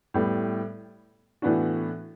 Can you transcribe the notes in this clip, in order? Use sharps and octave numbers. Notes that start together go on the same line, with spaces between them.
A2 G3 B3
A2 E3 B3 D4 F#4